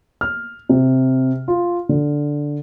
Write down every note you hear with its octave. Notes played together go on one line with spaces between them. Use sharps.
F6
C3
F4
D3